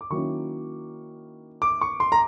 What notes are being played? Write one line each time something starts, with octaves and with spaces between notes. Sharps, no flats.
D6
D#3 F#3 A#3 C#4 E4 C#6
D6
C#6
C6
A#5